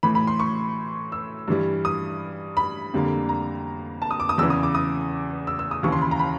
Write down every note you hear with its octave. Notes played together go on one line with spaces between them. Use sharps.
A2 E3 A3 B5
B5
C6
C#6
E6
G2 E3 G3
D#6
B5
F2 D3 G3 A#3
A#5
A5
D#6
D6
D#6
E2 C#3 E3 E6
D#6
D6
D#6
E6
E6
D#6
D#2 C#3 E3 C#6
C6
B5
A#5
B5